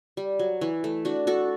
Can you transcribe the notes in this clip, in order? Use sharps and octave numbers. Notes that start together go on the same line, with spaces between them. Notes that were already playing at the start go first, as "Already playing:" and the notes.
G3
F#3
E3
A3
D4 F#4
F#4 A4